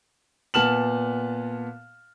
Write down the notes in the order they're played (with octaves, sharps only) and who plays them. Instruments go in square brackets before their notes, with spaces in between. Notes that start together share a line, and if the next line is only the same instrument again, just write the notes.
[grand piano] A#2 B3 A5 F6 E7 F#7